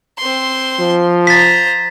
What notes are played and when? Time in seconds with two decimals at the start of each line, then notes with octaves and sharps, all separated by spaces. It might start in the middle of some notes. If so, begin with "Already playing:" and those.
0.19 C4 C6
0.79 F3
1.27 C5 A#5 A6 B6